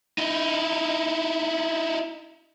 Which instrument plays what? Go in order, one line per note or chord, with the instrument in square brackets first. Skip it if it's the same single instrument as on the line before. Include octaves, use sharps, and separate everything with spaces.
[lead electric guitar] D#4 E4